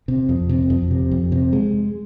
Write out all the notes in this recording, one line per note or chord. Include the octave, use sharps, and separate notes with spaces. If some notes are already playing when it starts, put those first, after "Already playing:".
C3
F2
C3
F2
C3
F2
C3
G#3